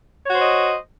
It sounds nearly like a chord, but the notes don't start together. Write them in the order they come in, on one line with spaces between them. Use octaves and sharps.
C#5 F#4 C5 D#5